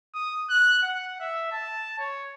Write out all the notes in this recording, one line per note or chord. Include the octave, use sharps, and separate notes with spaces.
D#6
F#6
F#5
E5
A5
C#5